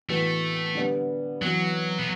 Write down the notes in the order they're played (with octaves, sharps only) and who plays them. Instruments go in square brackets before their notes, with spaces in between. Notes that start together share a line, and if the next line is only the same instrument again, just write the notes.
[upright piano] A2 E3 B3 F#4 [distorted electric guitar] A3
[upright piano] D3 G3 B3
[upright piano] E3 B3 F#4 [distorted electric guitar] F#3
[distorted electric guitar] B3